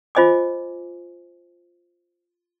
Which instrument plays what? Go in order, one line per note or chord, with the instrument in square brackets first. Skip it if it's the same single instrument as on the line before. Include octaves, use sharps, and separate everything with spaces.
[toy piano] F4 C5 D#5 G#5 D6